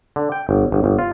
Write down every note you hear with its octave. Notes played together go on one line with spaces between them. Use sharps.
D3
G5
G1
G1
G1
F4